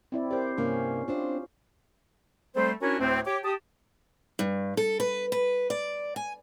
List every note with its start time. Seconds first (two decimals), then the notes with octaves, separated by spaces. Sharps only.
0.12 C4 E4 D5
0.31 G4 A#4 C5 D5
0.58 G2 C3 A#3 C#4
1.08 C4 D4 F4 C5
2.56 G3 A3 C4 A4 C5
2.82 C#4 D4 E4 F#4 A#4 C#5
3.00 D2 A2 A3 C4
3.26 G4 C#5 D6
3.44 G4 A5 D#6
4.39 G2
4.77 A4
5.00 B4
5.32 B4
5.70 D5
6.16 G#5